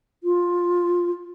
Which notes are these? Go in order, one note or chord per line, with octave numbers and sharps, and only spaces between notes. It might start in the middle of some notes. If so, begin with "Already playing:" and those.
F4